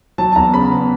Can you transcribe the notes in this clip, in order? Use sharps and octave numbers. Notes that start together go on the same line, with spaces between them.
F#3 A5
A5
E2 A#5
C#3 B5
B3